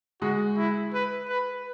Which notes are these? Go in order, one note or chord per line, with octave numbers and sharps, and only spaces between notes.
G#3 F#4
E4
B4
B4